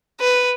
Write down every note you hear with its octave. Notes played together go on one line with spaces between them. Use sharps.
B4